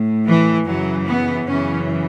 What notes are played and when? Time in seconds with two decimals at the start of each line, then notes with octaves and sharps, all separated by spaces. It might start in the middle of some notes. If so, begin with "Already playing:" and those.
Already playing: A2
0.26 E3
0.67 F#2 C#3 E3 F#3
1.07 B3
1.48 F#2 C#3 E3 C#4